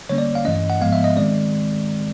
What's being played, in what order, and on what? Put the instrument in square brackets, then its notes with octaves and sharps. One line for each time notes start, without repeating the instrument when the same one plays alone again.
[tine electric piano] D3 G3 A#3 C#4 C#5
D5
F5
G2 E3 A3 C#4 D#5
F#5
G#2 F3 G#3 B3 F5
E5
D#5
D#3 G#3 C4 D5